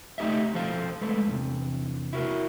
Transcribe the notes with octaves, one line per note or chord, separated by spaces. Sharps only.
A3 D#4 E4 G4 D#5 E5
B1 F3 A4 C5 F5
G#3 A3 A4 B4
E2 A2 C3
E4 F#4 A#4